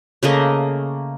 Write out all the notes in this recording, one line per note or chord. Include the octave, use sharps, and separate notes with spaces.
C#3 A3 A#3 D#5